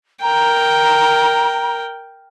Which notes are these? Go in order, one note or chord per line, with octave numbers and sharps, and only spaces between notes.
A#4 G5 A#5